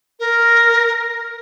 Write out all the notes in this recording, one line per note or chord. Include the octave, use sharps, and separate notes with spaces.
A#4